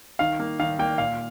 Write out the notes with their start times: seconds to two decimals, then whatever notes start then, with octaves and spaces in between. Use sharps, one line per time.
0.19 D#3 F5
0.40 A#3
0.59 D#3 F5
0.79 A#3 G5
0.98 A#2 F5